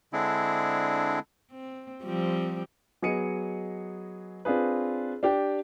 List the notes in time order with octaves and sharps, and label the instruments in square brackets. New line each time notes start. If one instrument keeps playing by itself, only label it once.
[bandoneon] D3 G#3 C4 D4 E4 G#4
[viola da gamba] C4
F3 G3 C4
[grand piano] F#3 B3 G#4 D#5 C#7 D#7
C4 D4 F4 G#4 B4
D4 G4 G5